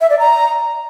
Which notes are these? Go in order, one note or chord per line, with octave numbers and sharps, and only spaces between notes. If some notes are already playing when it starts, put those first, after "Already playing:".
E5
D5
A#5